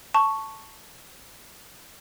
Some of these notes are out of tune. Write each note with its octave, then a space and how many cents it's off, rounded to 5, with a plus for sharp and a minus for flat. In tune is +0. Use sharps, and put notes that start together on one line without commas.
A5 +0 C#6 +0